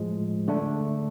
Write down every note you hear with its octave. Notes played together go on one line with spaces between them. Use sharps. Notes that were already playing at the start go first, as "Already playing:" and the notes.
Already playing: A2 F3 G#3
D3 A3 D4